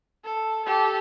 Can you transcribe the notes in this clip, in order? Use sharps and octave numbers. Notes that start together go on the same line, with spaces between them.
A4
G4 A4